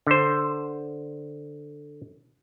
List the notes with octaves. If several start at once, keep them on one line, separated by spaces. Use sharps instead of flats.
D3 C5